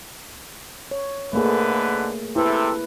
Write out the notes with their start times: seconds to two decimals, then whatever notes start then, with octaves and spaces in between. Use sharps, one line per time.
0.91 C#5
1.33 G#2 D3 A3 A#3 G#4 B4
2.36 C3 E4 A4 B4